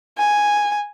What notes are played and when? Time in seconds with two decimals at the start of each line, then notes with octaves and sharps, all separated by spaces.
0.18 G#5